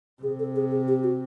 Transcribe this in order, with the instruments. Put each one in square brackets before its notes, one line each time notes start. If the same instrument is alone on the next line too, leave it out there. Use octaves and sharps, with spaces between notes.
[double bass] C3 [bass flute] G#4
[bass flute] A4
G#4
G#4
G4
F#4